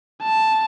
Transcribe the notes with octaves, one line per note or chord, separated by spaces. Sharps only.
A5